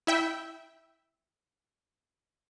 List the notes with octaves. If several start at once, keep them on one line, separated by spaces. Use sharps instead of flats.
E4 E5 G5